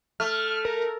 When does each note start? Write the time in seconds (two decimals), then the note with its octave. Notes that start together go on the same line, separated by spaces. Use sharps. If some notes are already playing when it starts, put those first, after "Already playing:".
0.20 A3 F6
0.65 A#4